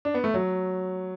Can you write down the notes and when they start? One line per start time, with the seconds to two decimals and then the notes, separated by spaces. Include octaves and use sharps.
0.05 D4
0.14 B3
0.24 A3
0.34 F#3